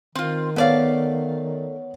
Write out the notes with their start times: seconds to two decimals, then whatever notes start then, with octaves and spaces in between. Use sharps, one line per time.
0.15 D#3 C4 F4
0.56 A3 B3 C#5 D5 F5